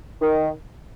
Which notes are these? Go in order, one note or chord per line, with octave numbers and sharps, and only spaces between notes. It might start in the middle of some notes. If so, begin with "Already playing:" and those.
D#3